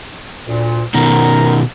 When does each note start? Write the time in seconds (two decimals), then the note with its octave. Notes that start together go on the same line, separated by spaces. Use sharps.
0.48 D2 A#2
0.94 B2 D#3 A#4 A#5